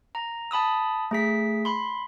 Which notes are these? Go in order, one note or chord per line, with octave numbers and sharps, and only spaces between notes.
A#5
A5 B5 D#6 E6
A3 G#4 B6
B5 C6